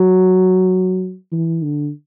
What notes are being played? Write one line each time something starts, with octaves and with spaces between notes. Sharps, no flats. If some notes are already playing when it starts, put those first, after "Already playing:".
Already playing: F#3
E3
D3